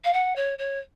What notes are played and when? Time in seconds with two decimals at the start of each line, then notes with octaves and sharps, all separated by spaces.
0.04 F5
0.13 F#5
0.36 C#5
0.59 C#5